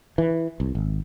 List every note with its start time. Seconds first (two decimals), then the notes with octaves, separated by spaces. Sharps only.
0.18 E3
0.60 C2
0.75 G#1